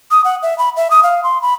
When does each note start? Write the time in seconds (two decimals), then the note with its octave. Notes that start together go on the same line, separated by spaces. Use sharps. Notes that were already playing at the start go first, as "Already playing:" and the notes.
0.11 D#6
0.24 F#5
0.43 E5
0.58 B5
0.77 E5
0.91 D#6
1.03 F5
1.24 C6
1.42 B5